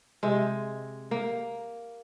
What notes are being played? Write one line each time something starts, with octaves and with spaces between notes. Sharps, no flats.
C3 G#3
A#3